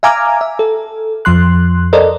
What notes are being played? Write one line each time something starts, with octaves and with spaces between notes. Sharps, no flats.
E5 F5 G#5 A#5 D6 F6
E5
A4
F2 F3 C6 F#6
A4 A#4 C5 D5 D#5